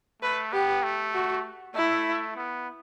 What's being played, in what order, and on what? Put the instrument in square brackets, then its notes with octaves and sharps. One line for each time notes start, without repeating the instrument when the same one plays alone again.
[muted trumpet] A3 [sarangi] B4
[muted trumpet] B3 [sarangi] G4
[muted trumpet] A3
[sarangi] F#4
[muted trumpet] A3 [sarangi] E4
[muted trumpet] B3